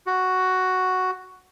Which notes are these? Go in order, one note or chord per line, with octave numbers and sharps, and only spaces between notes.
F#4